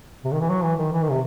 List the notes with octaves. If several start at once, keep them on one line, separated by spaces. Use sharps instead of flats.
C3
D#3
E3
F#3
E3
D#3
E3
D#3
C3